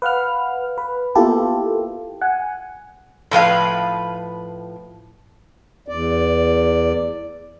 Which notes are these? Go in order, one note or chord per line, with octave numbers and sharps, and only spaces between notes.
B4 F5 F#5 F6
B4
A#3 B3 E4 F4 G4 A4
F#5 G#5
A2 F3 B4 F5
E2 D5